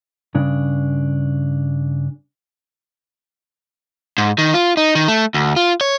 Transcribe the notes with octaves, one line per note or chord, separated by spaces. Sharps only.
G2 C#3 D4
G#2
D#3
F4
D#4
D#3
A3
D2
F4
C#5